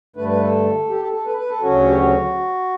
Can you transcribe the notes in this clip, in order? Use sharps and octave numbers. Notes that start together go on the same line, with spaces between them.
G2 D3 A3 B4
B4
A4
G4
A4
A4
B4
B4
A4
D2 C#3 F#3 C#4 F#4
G4
F#4